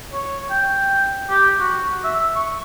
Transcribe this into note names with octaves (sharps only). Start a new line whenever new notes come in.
C#5
G5
G4
F#4
E5
C#6